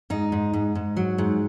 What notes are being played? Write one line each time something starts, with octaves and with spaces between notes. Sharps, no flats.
G#2 D#4
G#2
G#2
G#2
F#3
G#2